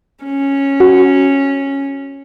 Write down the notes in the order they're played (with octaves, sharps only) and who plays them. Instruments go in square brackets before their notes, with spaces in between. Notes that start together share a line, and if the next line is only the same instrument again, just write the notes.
[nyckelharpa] C#4
[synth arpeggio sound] F#4